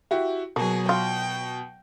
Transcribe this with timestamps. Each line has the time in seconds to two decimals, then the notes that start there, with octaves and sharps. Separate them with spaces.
0.11 E4 F#4 G4
0.56 B2 F#3 A#3 G#4
0.89 F4 G5